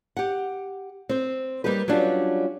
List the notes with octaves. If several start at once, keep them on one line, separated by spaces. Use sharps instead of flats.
G4 F#5
C4 C5
G3 A#3 D#4 G4 B4
F#3 G3 C#4 D4 F4